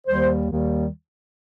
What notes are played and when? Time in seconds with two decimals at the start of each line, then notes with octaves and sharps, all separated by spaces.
0.07 D#2 D#3 G3 C5
0.48 D#2 D#3 G3